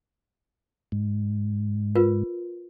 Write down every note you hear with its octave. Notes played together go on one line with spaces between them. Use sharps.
G#2
F4 A#4 B4